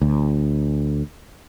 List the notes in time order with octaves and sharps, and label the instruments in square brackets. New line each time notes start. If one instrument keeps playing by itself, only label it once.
[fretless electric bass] D2